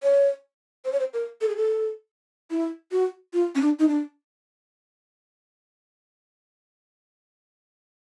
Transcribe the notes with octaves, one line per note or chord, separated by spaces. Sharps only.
C#5
C5
C#5
C5
A#4
A4
G#4
A4
E4
F#4
F4
C#4
D4
D#4
D4